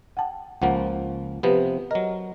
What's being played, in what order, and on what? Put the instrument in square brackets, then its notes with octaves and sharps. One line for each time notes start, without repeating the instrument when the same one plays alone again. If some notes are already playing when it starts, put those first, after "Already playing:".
[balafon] F#5 G5 A5
[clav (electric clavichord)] C#2 F3 A#3 [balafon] F#5
[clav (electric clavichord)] C3 F3 B3 [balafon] G4 B4
[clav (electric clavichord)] F#3 A#4 [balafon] D#5